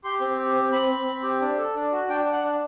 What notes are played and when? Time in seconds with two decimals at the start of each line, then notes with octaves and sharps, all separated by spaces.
0.04 G4 C6
0.20 C4
0.37 G4
0.55 C4
0.72 C4 B5
0.90 C4
1.06 C4
1.23 G4
1.40 D4
1.58 A4
1.75 D4
1.92 F#4
2.09 D4 G5
2.26 D4
2.33 F#5
2.44 D4